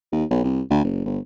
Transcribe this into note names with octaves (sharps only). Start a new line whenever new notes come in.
D#2
B1
C2
D2
F#1
G1